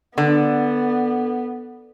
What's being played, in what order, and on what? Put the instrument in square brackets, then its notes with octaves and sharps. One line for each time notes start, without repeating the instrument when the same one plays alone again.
[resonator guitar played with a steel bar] D3 [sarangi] B3